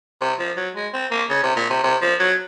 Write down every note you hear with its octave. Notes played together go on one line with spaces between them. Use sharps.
C3
F3
F#3
G#3
C4
A#3
C#3
C3
A#2
C3
C3
F3
F#3